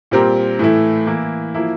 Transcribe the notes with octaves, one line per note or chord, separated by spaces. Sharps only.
A#2 G3 C4 G4 A#4
A2 E3 A3 E4
E3 A#3 E4
F3 A#3 E4